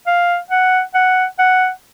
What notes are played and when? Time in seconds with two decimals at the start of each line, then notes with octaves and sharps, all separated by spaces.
0.07 F5
0.50 F#5
0.94 F#5
1.39 F#5